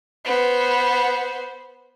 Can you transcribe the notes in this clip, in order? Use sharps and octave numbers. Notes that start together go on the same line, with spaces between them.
B3 C5